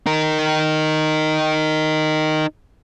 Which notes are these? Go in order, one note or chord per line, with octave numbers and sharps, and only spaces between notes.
D#4 A#4